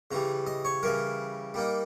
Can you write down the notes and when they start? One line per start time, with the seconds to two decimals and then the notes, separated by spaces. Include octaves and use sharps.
0.11 C#3 E3 G3 A#5
0.46 D#5
0.65 C#5
0.83 C#3 E3 G3 A#4
1.54 G3 A#3 D#4